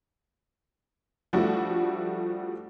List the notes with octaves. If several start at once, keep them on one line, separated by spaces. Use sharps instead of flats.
F3 G3 A3 D4 E4 F#4